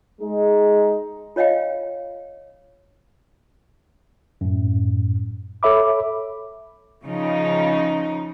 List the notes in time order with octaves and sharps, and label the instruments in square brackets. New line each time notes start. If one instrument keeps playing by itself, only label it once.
[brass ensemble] G#3 D#4
[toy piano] F4 C#5 D#5 F5 G5
[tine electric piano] F#2 A2
A4 C#5 E5 B5 D6
[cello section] C#3 F3 D#4